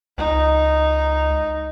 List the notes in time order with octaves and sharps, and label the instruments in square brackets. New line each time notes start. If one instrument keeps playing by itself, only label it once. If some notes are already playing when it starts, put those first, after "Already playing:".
[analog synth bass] C#2 [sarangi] D#4